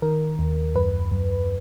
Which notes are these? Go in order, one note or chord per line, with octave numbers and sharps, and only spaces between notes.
D#3 A#4
D#2
F#2 B4
F#2